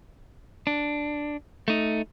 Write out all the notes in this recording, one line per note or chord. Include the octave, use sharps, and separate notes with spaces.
D4
A3 D#4